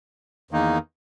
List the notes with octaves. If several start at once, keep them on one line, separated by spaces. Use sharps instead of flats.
E2 D#3 A#3 D#4